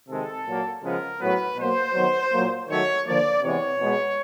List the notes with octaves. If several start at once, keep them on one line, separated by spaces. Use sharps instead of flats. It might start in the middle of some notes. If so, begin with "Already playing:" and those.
C3 D#3 G#3 A4
A#2 F#3 A#3
C#3 F3 G#3 B3 A#4
A2 F#3 B3 B4
B2 F#3 A#3 C5
D#3 F#3 B3
A#2 F#3 A#3
D#3 F#3 A3 C#5
D3 F3 A#3 D5
C3 E3 G#3 B3 C#5
B2 G#3 B3